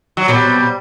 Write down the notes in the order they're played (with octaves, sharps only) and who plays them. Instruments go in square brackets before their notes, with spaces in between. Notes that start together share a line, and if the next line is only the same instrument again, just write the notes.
[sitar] F#3
[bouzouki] B2 F#3 C4 [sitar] G3